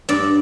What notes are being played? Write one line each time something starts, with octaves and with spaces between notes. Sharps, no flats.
G2 D5